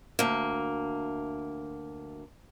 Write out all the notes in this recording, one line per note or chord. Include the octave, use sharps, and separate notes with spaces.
D2 A#3